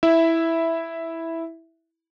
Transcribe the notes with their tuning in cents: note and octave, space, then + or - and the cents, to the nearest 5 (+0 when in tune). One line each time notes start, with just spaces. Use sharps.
E4 -5 E5 +0